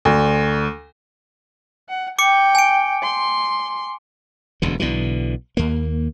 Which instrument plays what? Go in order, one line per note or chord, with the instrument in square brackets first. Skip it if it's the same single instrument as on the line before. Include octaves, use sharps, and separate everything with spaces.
[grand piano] D2
[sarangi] F#5
[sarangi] G5 [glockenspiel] D6 C#7
[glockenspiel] G#5 D7
[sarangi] C6
[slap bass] E1 D2 D3
B1 B2 D3 E3
D#2 A#3